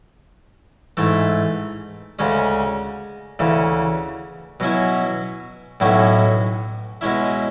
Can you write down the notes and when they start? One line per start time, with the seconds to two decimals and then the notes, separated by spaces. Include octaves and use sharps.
0.97 G#2 E3 A3
2.19 D2 C#3 G#3 C#4
3.39 D2 C#3 E3
4.60 B2 F#3 C#4 E4
5.80 B1 A2 F#3 C#4 E4
7.01 B2 G#3 C#4 E4